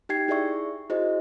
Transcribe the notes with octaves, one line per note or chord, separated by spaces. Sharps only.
D#4 G4 G5 G#6 C7
E4 G#4 D5 E5 C#6
E4 F#4 G#4 C5 D#5